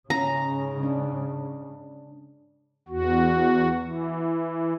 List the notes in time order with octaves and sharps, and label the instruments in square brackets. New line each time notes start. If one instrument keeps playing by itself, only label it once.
[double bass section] G#2 C#3 [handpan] C#4 [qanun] A#5
[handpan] D4
[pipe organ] E2 F#4
E3